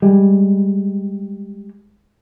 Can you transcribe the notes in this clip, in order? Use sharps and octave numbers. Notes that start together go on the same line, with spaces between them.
G3 G#3